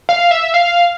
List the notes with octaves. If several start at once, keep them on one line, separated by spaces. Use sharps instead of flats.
F5
E5
F5